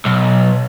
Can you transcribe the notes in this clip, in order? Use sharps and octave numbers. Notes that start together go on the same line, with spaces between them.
B1